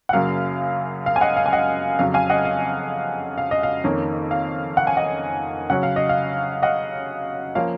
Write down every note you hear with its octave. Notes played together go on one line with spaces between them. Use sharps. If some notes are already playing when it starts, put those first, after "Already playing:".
F#5
F#2 C#3 F#3 A#3 F5
F5
G#5
D#5 F#5
F5
G#5
D#5 F#5
F2 C#3 F#3 F5
F5 G#5
D#5 F#5
F5
F5
D#5
F5
F2 D#3 A#3 C#4
F5
F#5
G#5
D#5 F#5
C#3 F#3 C#4 F#5
F5
D#5
F5
D#5 F#5
F3 A#3 C#4 F5